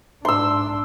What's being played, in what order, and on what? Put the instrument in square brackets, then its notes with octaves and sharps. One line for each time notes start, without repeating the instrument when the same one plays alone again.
[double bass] G#2 D4 [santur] C6 E6